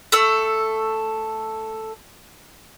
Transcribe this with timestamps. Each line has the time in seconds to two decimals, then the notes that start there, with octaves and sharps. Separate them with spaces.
0.12 A3 A4 E6